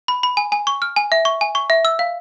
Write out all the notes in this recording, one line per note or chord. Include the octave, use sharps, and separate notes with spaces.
B5
B5
G#5
G#5
C#6
F6
G#5
E5
C#6
G#5
C#6
E5
E6
F5